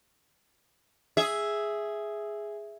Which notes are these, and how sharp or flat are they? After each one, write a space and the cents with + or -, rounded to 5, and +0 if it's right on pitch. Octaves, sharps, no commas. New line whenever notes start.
G#4 +0 E5 +0